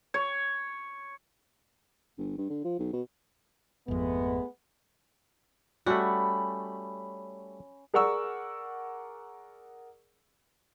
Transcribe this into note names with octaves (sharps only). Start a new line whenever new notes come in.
C#5
G1
G2
D3
F3
B1
B2
G#1 F2 G#3 A3 B3
G3 A3 C#4 F#4 B5
G#4 A#4 D5 F#5 C#6 E6